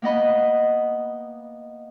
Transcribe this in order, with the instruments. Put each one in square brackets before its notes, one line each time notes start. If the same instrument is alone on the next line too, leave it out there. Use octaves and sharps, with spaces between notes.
[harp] A#3 B3 D#5 B5